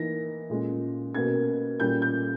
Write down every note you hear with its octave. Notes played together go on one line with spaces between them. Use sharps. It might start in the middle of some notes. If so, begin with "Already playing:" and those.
Already playing: E3 A#3 D#4 A#6
A#2 G#3 C#4
B2 A#3 C#4 G#6
A#2 G3 C#4 G6
G6